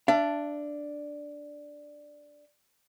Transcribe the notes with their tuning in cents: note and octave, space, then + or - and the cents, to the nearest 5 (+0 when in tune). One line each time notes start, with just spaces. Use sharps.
D4 +0 E5 +40